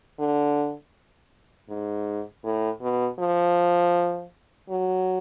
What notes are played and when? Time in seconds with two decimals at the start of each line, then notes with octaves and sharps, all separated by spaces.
0.20 D3
1.69 G#2
2.44 A2
2.81 B2
3.20 F3
4.69 F#3